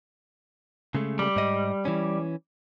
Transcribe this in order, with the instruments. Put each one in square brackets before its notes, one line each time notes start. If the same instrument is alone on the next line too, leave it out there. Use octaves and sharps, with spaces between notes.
[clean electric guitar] C#3 G#3 A3
[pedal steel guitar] G3
[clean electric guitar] G#2 D#5
E3 C#4